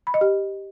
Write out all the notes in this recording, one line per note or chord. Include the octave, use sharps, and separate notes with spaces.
B5
D#5
G4